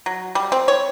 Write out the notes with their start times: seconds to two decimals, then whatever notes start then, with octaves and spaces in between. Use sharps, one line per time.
0.06 F#3
0.35 G3
0.52 C4
0.68 C#5